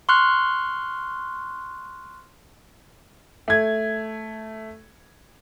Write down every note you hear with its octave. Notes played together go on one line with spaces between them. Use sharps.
C6 C#6 F6 F#6
A3 G#6